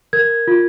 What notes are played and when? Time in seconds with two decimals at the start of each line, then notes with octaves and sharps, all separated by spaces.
0.13 A#4 G#6
0.48 F4